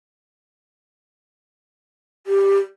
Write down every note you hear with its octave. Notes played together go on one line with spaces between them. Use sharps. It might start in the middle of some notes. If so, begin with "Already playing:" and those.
G4